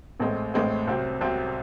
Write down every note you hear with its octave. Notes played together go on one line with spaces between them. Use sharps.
A1 A2 G#3 C4
A1 A2 G#3 C4
C2 C3 F#3 C4
C2 C3 F#3 C4